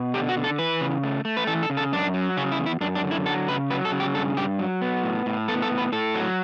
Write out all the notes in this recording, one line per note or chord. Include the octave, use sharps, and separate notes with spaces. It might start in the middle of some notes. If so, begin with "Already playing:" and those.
Already playing: B2
D3 G4
F#4
D3
A4
E3 B4
C#3
A3
A3
B4
E3 A4
A4
C#3
A4
F#2 D4
F#3
C#3 C#4
E4
E2
E4
F#2 D4
D4
D3
E4
F#3 A4
C#3 B4
F#3 B4
A4
C#3
G4
G2 A4
G2 G4
F#3
B3
A2
A2
B3 A4
A4
A2
B4
A2 A4
F#3